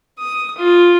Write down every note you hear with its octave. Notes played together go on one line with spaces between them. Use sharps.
D#6
F4